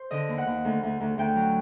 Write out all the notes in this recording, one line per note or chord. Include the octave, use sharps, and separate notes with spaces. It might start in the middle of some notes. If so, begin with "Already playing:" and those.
Already playing: C5
D3 D#5
D#2
F#5
D#2
D2
D2
D2
D2 G5
F#3